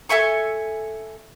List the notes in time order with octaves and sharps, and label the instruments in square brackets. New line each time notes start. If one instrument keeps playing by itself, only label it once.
[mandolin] A4 E5 G#5 C#6